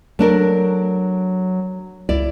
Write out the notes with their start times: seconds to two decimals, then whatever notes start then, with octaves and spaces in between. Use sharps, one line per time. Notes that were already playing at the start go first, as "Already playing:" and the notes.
0.19 F#3 A3 D4 A#4
2.09 C#2 E4 D5